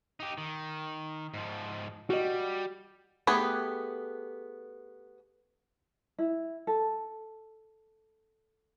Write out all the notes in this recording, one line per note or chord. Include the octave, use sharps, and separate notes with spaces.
D#4 G4
D#3
G#2 F3
G3 F#4 D#5
A3 B3 G4 G#4 B4
E4
A4